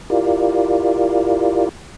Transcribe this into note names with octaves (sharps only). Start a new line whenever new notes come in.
E4 F4 G4 A#4 D5 F5